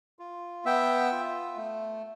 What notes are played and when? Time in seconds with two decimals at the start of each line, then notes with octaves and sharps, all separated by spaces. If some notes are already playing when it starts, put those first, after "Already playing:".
0.19 F4
0.65 B3 E5 G5
1.12 F4
1.57 A3